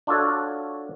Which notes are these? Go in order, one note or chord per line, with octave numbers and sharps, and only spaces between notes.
D4 F4 F#4 A4 C#5